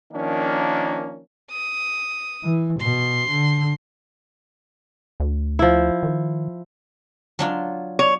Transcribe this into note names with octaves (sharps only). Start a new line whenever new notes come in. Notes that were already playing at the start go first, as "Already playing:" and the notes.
D#3 F3 A#3 C#4 D4
D#6
E3
B2 C6
D3
D2
F3 E4
D#3
F#3 D4 F4
C#5